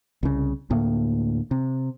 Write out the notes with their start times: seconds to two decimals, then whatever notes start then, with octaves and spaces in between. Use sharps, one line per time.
0.23 C2 C#3
0.70 D2 A2 A#3
1.51 C3